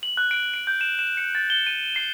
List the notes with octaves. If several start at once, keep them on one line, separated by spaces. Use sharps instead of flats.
F#7
F#6
D7
D7
G6
E7
E7
C#7
A6
G7
D#7
C7